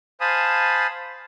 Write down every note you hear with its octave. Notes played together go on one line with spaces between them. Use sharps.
C5 F5 G#5 A5 B5 D#6